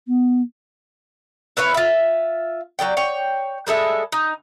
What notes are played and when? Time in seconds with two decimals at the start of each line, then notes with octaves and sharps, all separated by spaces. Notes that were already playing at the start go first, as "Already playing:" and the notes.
0.08 B3
1.57 E4 B4 C#5 F5
1.74 F4 E5
2.79 F#3 G3 D5 G5
2.97 C#5 G5
3.67 G3 G#3 A4 E5
4.12 D#4